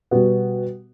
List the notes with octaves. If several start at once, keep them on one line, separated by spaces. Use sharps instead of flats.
B2 G3 B3 F#4